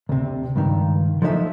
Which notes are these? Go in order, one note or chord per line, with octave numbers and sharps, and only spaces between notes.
D2 C3
C#2 G2 D#3
F3 F#3 A3 D#4 B4 E5